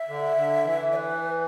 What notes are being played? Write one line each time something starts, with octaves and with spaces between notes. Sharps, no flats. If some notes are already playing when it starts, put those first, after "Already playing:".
Already playing: E5
D3
D3
E3
D5
B4